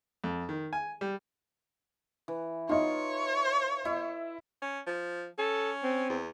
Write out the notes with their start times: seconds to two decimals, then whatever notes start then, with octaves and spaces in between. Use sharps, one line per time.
0.24 F2
0.49 D#3
0.73 G#5
1.01 G3
2.28 E3
2.69 D#4 F4 C#5 D#5 E5
3.85 E4 D#5 E5
4.62 C#4
4.87 F3
5.39 C#4 A4
5.84 C4
6.10 E2